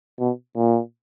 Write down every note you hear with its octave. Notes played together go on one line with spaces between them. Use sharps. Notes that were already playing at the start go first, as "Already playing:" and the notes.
B2
A#2